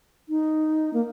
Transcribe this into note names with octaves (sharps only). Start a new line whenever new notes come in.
D#4
A#3